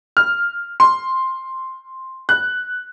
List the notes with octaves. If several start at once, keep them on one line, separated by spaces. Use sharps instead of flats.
F6
C6
F#6